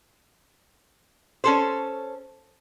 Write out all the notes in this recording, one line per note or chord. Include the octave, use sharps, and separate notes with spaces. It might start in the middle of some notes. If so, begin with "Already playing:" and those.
C#4 A4 C5